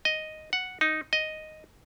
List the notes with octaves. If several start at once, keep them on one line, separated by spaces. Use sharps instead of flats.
D#5
F#5
D#4
D#5